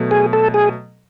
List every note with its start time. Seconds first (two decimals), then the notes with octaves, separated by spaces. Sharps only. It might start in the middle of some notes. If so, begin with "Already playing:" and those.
Already playing: B2 F#3 A3
0.11 G#4
0.33 A4
0.54 G#4